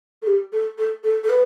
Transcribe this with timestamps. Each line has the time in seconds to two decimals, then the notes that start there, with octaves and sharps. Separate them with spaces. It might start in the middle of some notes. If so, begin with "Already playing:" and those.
0.22 A4
0.27 G4
0.52 A4
0.78 A4
1.03 A4
1.23 A4
1.29 B4